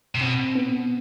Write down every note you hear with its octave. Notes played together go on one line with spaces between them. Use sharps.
C3
B2 C4
B3